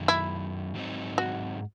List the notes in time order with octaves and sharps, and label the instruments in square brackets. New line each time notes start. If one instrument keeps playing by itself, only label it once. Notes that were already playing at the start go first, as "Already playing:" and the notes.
Already playing: [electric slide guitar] F#2 D#3 F#3
[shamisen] E4
[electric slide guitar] G#2 F#3 C4 D#4
[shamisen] F#4